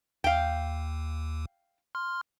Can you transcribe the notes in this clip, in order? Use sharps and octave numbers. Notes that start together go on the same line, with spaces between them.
D#2 F5 G5
C6 F6